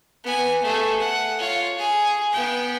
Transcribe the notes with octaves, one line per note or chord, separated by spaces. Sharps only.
B3 G#5
A3 G#4
F#5
F4 C#5
G#4
B3 G5